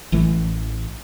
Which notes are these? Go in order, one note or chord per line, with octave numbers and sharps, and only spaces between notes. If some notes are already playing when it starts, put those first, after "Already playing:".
A1 E3 A3